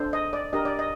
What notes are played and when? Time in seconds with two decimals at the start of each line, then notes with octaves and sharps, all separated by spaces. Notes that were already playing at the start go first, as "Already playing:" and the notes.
Already playing: D4 A4 C5
0.13 D#5
0.33 D5
0.53 D4 G4 A#4 D#5
0.65 D5
0.79 D#5